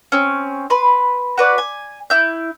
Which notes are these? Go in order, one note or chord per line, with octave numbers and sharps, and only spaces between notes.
C4 C#4
B4 B5 C6
F#4 B4 D5
G#5
E4 G6